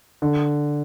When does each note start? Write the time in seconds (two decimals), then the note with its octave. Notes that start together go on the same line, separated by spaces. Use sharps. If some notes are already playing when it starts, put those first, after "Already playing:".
0.22 D3